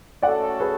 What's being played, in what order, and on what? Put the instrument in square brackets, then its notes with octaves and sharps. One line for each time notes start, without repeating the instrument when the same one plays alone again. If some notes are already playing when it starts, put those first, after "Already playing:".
[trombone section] A3 C#4 F#4 A4 [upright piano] D5 F#5
[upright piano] G#4 B4